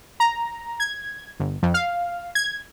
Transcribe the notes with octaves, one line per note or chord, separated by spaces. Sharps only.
A#5
G#6
G1
F2
F5
G#6